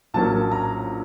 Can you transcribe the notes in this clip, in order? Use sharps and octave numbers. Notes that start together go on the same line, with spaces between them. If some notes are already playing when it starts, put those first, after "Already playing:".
A#1 A2 F#3 A#3 C#4 A5
A#5